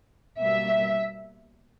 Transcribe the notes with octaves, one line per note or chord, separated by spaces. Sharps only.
B2 G3 A#3 E5